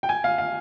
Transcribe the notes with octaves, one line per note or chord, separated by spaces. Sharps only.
G5
G#5
F5
F5